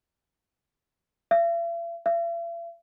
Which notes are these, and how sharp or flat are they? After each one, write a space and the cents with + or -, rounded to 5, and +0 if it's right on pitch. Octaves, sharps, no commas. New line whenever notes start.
E5 +45
E5 +45